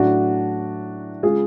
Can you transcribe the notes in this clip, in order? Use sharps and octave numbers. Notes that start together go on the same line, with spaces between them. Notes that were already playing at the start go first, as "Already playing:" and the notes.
Already playing: A2 F#3 A3 D4 F#4
C#3 G#3 F4 G#4